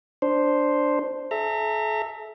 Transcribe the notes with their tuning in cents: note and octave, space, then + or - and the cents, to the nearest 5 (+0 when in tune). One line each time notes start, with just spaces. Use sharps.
D4 +0 C5 +0
A4 -45 E5 +0 A#5 -35